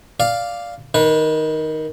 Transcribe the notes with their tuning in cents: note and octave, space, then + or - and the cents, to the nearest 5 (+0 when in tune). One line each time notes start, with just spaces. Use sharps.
D5 +0 F5 +0
D#3 +5 B4 -25